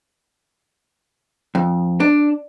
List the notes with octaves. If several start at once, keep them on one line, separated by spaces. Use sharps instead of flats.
F2
D4